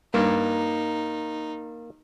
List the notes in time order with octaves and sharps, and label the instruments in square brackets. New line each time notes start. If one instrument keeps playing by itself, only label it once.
[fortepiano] G2 [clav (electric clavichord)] A#3 [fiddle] D#4